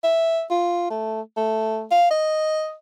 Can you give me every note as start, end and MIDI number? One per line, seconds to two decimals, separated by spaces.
0.04 0.44 76
0.51 0.88 65
0.90 1.21 57
1.37 1.86 57
1.91 2.11 77
2.11 2.74 75